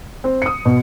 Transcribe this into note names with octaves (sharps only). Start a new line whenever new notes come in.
C4
D#6 C#7
B2